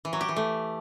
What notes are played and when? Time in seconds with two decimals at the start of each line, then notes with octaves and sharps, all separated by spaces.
0.05 E3
0.13 F#3
0.21 G4
0.29 E3
0.36 A3